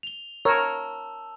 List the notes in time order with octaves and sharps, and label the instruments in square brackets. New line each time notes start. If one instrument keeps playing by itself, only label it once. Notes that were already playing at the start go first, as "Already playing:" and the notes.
[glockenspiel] F7 G7
[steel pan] A#4 C#5 [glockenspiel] A5 E6